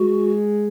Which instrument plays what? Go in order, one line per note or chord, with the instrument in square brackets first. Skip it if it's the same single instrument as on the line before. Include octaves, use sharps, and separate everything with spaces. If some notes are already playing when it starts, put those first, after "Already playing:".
Already playing: [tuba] G#3 [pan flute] F#4